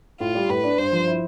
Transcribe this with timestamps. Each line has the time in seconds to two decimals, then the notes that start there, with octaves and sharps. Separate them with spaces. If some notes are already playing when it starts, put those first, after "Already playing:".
0.20 A2 F4
0.35 G3
0.49 A2 B4
0.64 D4
0.78 G2 C5
0.92 F3
1.07 E4